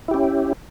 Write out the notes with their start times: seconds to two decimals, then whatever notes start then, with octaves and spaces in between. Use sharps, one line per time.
0.08 E4
0.11 G4
0.14 C#4